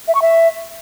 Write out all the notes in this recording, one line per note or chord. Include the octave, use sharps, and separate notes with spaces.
E5
C#6
E5